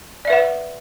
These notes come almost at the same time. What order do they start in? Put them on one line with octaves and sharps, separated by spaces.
D5 E5 B4 F#5